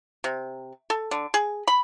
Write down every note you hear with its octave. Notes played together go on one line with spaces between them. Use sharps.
C3
A4
D3
G#4
B5